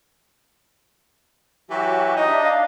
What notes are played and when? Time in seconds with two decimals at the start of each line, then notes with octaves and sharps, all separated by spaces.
1.70 E3 F#3 F#4 G4
2.17 D#4 D#5
2.28 D4 E5
2.43 F5